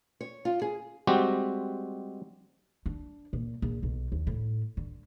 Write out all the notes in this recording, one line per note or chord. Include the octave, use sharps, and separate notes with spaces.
C#5
F4
G#4
G3 G#3 C4 F#4 G4
D4
A#2
A#1
B1
D#2
A2
D3